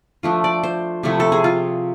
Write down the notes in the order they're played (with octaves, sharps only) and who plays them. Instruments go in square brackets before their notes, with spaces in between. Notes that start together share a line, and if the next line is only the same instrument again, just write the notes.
[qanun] F3 A3 D4 F4
D5
C5
C3 F3 A3 E4
A4
G#4
F4